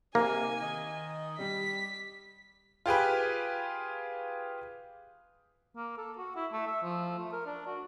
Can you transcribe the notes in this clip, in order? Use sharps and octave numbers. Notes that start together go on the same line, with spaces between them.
C3 A#3 D#4 G#5
D#3 D#5
G3 B6
F4 G4 G#4 B4
A#3
A4
F#4
E4
A3
E5
F3
A3
A#4
D4
F#4